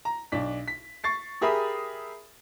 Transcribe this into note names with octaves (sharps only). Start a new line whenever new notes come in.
A#5
B1 D4 B6
B6
C#6 A6 C7
G4 G#4 A#4 E5 B5 D#6